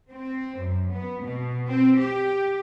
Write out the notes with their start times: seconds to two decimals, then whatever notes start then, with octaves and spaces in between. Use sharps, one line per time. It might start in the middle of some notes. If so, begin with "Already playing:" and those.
0.10 C4
0.59 F#2
0.91 B3
1.23 B2
1.67 C4
1.98 G4